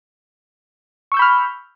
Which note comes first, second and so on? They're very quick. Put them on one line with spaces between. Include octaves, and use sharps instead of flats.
C#6 E6 G6 B5 F6